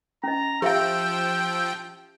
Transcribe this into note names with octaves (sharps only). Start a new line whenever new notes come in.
C#4 D#5 A#5
F3 G4 E5 F5 G5 E6